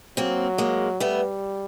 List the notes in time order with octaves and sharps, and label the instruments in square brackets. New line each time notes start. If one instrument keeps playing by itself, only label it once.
[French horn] F#3 [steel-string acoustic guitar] A#3 C4
[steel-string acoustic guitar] G#3 A#3
[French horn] G3 [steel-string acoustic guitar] A3 B3